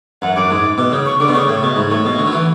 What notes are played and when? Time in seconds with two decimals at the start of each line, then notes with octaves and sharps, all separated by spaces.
0.22 F#2 F#5
0.36 F#2 D6
0.51 G#2
0.78 B2
0.92 C#3
1.06 C#6
1.20 D3 D6
1.28 B2
1.34 C#3 C#6
1.48 A2
1.63 B2
1.76 G#2
1.90 A2 C#6
2.05 B2
2.18 D3
2.26 F#3
2.33 E3